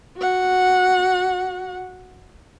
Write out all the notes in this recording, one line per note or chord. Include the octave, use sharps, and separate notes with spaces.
F#4 F#5